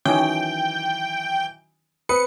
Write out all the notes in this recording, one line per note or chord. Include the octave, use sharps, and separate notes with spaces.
D#3 E3 F#3 C#4 D#4 G5
C4 B4 D#6 C#7